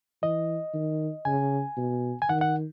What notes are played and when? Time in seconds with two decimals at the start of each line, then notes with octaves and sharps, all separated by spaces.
0.22 E3 D#5
0.74 D#3
1.25 C#3 G#5
1.77 B2
2.22 G#5
2.29 D#3 F#5
2.41 F#5